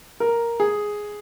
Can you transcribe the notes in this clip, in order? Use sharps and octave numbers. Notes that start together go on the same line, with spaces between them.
A#4
G#4